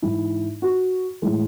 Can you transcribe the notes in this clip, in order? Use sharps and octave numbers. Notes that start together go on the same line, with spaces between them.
G#2 E3 E4
F#4
A2 E3 G#3